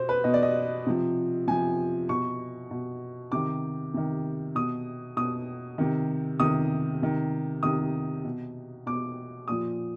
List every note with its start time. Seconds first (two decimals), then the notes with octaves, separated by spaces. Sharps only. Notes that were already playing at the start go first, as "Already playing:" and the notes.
Already playing: B2 C5
0.09 B4
0.24 B2 D#5
0.34 D5
0.43 D#5
0.87 C3 F3
1.47 C3 F3 G#5
2.09 B2 C#6
2.71 B2
3.32 C3 D#3 D6
3.94 C3 D#3
4.55 B2 D#6
5.17 B2 D#6
5.78 C3 D#3
6.39 C3 D#3 D#6
7.02 C3 D#3
7.63 C3 D#3 D#6
8.25 B2
8.86 B2 D6
9.48 A#2 F3 D#6